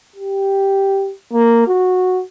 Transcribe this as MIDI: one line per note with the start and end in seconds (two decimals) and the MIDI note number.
0.16 1.12 67
1.33 1.65 58
1.68 2.22 66